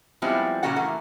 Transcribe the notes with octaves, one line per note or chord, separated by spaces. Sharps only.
F3 G3 G#3 B3 C4 E4
A#2 C#3 A#3 C#4 F#4 F#5
E3 A3 A#3